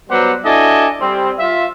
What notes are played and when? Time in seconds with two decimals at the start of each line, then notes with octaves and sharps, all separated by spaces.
0.10 F#3 G3 B3 G4 C5 F#5
0.45 D4 E4 F#4 A4 D#5 G#5
1.01 G3 C4
1.39 F4 E5